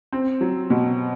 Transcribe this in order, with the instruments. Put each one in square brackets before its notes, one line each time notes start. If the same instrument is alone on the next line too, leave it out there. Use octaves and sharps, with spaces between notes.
[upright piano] C4
F#3
B2